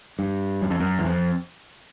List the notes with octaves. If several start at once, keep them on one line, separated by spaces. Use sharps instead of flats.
G2
F#2
F2
F#2
E2
F2